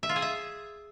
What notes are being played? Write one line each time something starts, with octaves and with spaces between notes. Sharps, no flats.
E5
F4
G#4
E5